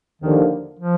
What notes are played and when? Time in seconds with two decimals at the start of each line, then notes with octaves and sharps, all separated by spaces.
0.21 D#2 D3 D#3 F3 A#3 D4
0.79 F3